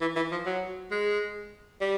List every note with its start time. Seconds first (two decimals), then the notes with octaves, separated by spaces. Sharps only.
0.01 E3
0.16 E3
0.32 F3
0.46 F#3
0.91 G#3
1.81 G3